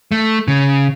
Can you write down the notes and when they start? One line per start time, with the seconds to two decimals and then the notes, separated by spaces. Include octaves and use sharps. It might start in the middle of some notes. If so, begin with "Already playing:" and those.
0.12 A3
0.48 C#3